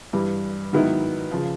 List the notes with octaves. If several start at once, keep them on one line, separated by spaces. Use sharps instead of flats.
G2 E3 G3
G#2 D#3 F#3 B3 E4
C#3 F3